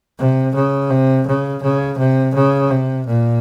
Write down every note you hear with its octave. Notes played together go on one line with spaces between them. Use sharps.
C3
C#3
C3
C#3
C#3
C3
C#3
C3
A#2